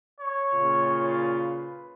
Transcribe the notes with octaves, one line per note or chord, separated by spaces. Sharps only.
C#5
A#2 C#3 F4
B4